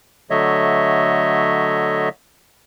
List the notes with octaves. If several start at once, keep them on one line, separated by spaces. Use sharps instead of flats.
D3 F#3 A3 C#5 D#5 E5